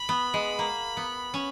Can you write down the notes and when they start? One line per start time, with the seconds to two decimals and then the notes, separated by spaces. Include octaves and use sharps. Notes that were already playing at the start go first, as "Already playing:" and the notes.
Already playing: B5
0.09 B3
0.34 G#3
0.59 A#3
0.97 B3
1.34 C#4